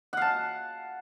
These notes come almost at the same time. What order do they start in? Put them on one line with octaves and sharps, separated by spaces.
F#5 F5 A5